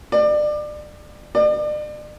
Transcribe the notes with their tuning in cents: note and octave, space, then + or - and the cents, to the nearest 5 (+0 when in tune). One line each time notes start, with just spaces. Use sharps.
D5 +30
D5 +40